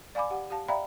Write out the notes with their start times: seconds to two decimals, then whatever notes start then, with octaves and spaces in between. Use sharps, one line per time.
0.15 D5 F5 G#5 B5 D6
0.31 G4 F#5
0.50 G4 F5 A5
0.68 D5 E5 F5 G5 A#5 B5